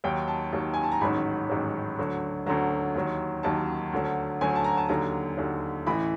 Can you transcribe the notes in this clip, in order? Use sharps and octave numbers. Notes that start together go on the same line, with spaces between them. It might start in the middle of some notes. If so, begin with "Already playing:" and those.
D#2 D#3 F#3 G5
A5
D#2 D#3 F#3
G#5
A5
A#5
A1 G#2 D#3 F#3 B5
A1 G#2 D#3 F#3
D2 D3 F#3
D2 D3 F#3 A#5
D#2 D#3 F#3
D#2 D#3 F#3 A5
D2 D3 F#3
D2 D3 F#3 G#5
A5
A#5
A5
D#2 D3 F#3 A#5
D#2 D3 F#3
A1 A2 E3 B5